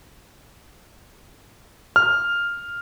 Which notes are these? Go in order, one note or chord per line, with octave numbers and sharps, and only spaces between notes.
F6